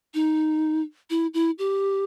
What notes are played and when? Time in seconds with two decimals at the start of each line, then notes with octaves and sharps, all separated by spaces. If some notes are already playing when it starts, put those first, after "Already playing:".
0.14 D#4
1.10 E4
1.34 E4
1.58 G4